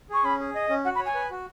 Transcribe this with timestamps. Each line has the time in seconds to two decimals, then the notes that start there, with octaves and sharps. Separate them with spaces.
0.10 G#4 C#6
0.24 C#4 B5
0.40 G#4
0.55 D#5
0.69 C#4
0.85 F#4 F#5
0.95 B5
0.99 C#5
1.06 G#5
1.15 B4
1.31 F#4